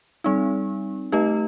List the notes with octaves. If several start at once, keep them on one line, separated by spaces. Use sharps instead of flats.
G3 C4 D#4
A3 D#4 G4 D#5